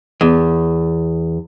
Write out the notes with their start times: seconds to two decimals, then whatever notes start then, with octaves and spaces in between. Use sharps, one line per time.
0.21 E2